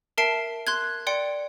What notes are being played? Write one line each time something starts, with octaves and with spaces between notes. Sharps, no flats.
A#4 E5 A5 C7 D7
C6 F#6 G#6
D5 G5 C6 C#7